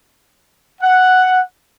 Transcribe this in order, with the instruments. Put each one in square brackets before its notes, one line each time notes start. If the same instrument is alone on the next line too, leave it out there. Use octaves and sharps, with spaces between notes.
[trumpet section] F#5